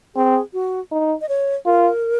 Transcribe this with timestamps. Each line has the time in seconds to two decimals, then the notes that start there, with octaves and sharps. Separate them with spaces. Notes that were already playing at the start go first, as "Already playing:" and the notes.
0.15 C4 G#4
0.54 F#4
0.92 D#4
1.21 D#5
1.29 C#5
1.66 F4 A#4